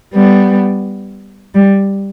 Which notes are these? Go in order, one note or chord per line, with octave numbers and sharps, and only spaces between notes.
G3 B3
G3